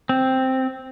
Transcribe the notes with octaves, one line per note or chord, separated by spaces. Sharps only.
C4